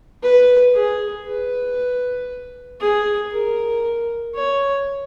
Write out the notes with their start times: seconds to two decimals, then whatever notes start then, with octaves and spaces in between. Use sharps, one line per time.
0.23 B4
0.74 G#4
1.26 B4
2.80 G#4
3.32 A#4
4.35 C#5